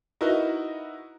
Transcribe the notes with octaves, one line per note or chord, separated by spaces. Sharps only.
D#4 E4 F#4 A#4 B4 D#5